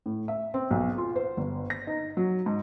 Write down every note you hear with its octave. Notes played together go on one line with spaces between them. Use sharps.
A2
E5
C4
B1
F4
C5
G1
A#6
D#4
F#3
G#2